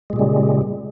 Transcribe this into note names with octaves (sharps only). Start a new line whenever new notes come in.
A#2 C#3 G3 G#3